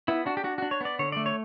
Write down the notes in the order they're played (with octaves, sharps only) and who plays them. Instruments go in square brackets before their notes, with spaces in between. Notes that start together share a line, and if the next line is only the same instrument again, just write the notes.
[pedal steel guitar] B3 E4
D4 F#4
G4
D4 F#4
D4 F#4
C#5
B3 D5
D3 C#5
A3 D5
C#5